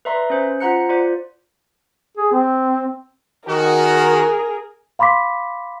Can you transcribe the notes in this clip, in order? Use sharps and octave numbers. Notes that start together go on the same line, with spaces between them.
B4 D5 E5 A#5 C6
C#4 C5
F4 C5 F#5 A#5 F#6 C#7
F4 C5 D5
G#4
C4
D#3 F#4 G#4 A#4
F5 B5 C6 D6 B6